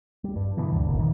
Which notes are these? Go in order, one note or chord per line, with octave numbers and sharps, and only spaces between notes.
G3
G2
B2 D3 E3 B3
D2 G2 D3 G3
F#1 C2 F#2 A#2
F2 A#2 D#3 E3